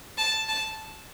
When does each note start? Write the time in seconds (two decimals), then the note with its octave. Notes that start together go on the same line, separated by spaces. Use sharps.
0.18 A5
0.48 A5